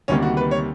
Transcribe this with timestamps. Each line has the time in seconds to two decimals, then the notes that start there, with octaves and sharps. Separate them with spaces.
0.08 D2 C3 D#3 G3 A#3 C#4
0.22 F#4
0.37 B4
0.51 C#5